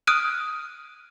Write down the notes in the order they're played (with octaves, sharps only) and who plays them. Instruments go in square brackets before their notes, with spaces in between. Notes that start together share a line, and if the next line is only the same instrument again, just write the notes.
[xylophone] D#6 F6 F#6 D7 D#7